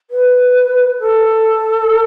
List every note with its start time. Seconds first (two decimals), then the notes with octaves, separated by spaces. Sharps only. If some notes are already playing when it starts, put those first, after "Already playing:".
0.10 B4
1.00 A4